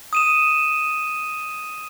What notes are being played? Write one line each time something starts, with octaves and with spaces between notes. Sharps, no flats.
D#6 D#7 E7